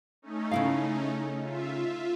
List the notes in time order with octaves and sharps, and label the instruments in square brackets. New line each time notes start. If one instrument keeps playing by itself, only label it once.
[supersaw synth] A3 C#4 D#4
[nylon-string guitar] C#3 E4 F5
[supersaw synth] F4 E5